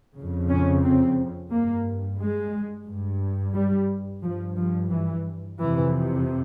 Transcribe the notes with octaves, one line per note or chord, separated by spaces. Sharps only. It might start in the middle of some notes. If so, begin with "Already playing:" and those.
F2 C#3
C#4
C4
G2 A#3
G#3
G2
G3
G2 F3
F3
E3
F2 C3 E3